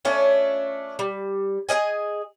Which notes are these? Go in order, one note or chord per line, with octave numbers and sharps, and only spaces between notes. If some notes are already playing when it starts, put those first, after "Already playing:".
A3 C#4 D4 F4
G3
G#4 B4 D#5 G#5